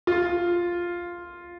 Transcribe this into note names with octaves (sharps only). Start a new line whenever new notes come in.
F4